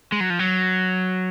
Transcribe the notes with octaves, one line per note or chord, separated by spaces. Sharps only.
G#3
F#3
F3
F#3